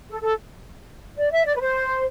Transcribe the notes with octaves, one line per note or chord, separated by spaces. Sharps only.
A4
A4
D5
E5
D5
B4
C5